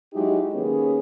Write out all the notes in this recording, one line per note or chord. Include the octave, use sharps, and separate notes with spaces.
F#3 G#3 D#4 E4 F#4 G4
D#3 A#3 B3 C#4 G#4